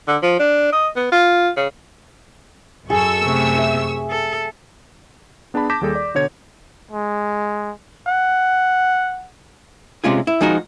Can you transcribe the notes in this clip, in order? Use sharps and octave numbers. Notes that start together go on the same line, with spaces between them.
D3
F3
D4
D#5
B3
F4
C#3
F#2 G#4 A4 C#6 E6
C3 A3
E5
A4
B3 D4 G#4 A5 B5
A5 D6 G6 A#6 B6 E7
D#2 G3 G#4 A4
D5
B2 D3 C#5 G#6
G#3
F#5
C3 G#3 C#4 F4 G#4
E4
F3 G#3 D#4 F#4 A#4